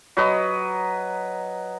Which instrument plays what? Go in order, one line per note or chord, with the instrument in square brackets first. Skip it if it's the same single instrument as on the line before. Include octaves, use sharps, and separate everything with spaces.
[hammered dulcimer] F#3 B4 D#5